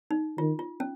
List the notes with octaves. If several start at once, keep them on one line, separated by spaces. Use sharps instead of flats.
D#4
D#3 F4
F4
C#4